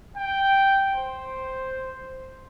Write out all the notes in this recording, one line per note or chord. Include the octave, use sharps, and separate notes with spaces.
G5
C5